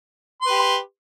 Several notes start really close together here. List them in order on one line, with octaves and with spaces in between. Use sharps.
C6 B4 G4